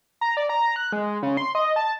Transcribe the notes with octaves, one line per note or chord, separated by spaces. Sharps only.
A#5
D5
A#5
F#6
G#3
C#3
C6
D#5
A5